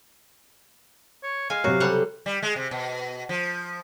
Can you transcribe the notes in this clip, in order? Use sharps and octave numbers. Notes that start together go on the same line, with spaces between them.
C#5
G#3 F5 G#5
C3 F#3 F#4
C#3 G3 A4 C5 F#5
G3
G#3
C3
B2
F3